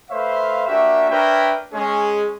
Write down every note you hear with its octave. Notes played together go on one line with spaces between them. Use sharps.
A3 B4 C5 E5 F5
A#3 D4 F#4 G4 E5
D4 A#4 B4 C#5 E5 G5
G#3 C#4 G#4